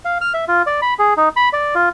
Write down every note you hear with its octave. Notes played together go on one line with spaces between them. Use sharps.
F5
F6
E5
F4
D5
B5
G#4
D#4
B5
D5
F4